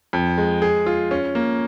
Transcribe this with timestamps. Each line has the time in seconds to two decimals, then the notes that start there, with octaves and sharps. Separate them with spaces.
0.13 F2
0.38 G#3
0.62 G#4
0.86 F4
1.11 C#4
1.35 A#3